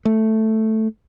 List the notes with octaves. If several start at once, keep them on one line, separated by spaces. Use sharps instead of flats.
A3